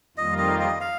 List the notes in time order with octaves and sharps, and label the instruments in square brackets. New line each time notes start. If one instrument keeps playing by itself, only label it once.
[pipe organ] F2 D#3 G3 A#3 F4 [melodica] D#5
[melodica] D#5
D#5
F5